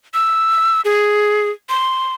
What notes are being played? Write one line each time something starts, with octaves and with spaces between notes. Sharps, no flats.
E6
G#4
C6